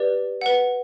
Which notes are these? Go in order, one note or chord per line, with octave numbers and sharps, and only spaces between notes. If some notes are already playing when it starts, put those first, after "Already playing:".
Already playing: G4 B4 D5
B4 F#5